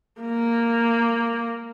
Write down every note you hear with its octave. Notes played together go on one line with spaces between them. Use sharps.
A#3